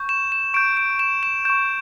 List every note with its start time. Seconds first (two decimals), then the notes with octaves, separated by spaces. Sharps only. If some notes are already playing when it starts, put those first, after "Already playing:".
Already playing: C#6 G6
0.09 E7
0.32 E7
0.54 C#6 G6 D7
0.77 D7
0.99 E7
1.23 E7
1.45 C#6 G6 E7